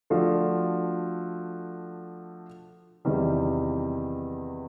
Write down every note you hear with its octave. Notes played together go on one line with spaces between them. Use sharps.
F3 A3 D4 F#4
E2 C3 D#3 G3